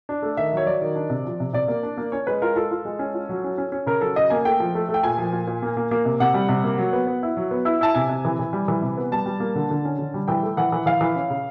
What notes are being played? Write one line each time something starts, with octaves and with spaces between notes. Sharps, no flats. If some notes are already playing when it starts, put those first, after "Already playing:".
D4
A3
D#3 E5
F#3 C#5
F#3 D5
D#3
D4
C3
F3
C3
C3 D5
A#3
D4
A#3
C#4 C#5
G#3 B4
F4 A#4
F4 A4
F4
G#3
C#4
F4
F#3
C#4
C#4
C#4
C#3 A#4
F#3 A4
C#3 D#5
A#3 G#5
A3 G5
F3
A3
A3
G5
A#2 G#5
F3
A#2
A#2
A#3
A#3
A#3
C3
C3 F#5
G3
C3
A#3
F#3
B3
B3
E4
F#3
B3
E4
E4 A5
C3 G#5
C3
E3
E3
G3
E3
C3
B3
G3 A5
G3
A#3
D3
D3
C#4
D3
G3
E3 G5
A3
E3 F#5
E3
E3 F5
E3
C#4
C#3